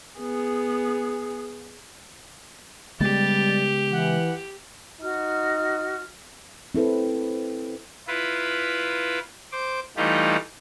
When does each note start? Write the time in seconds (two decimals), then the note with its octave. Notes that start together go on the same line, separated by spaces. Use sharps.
0.20 B3 G#4
3.00 C#3 G3 G#3 B3 G4 A6
3.92 E3 F#5
5.00 D#4 F#4 F6
6.74 C4 E4 A4 B4
8.08 E4 F4 B4
9.52 C5 D6
9.97 E3 G3 A3 D#4 F4 G4